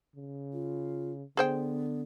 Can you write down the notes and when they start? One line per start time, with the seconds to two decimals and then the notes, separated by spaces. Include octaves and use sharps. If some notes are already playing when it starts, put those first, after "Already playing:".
0.16 C#3
0.53 F4
1.37 D3 B3 G#4 C5 G5